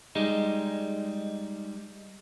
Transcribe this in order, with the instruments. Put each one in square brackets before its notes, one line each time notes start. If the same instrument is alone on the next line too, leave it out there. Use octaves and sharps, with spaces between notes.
[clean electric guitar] G3 G#3 D#4